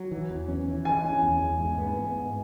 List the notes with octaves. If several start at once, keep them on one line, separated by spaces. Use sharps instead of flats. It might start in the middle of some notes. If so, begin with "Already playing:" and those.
Already playing: F#3
E3
E2
C#4
E3
E3 G#5
C#4
E2
E2
G#2
B3
B3
G#2